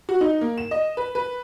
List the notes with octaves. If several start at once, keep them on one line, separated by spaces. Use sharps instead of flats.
F#4
D#4
A#3
E7
D#5
B4
B4